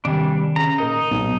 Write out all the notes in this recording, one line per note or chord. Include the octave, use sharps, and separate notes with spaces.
C3 D#3 G3 D4 G#5
C#3 A#5
A#2 D#4 A#4 A#5
B1 A#2